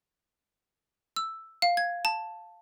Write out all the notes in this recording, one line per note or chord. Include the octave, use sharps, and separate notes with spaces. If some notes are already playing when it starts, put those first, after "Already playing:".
E6
F5
G#6
A5